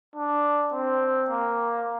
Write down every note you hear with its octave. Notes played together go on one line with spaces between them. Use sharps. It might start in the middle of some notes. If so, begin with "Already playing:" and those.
D4
C4
A#3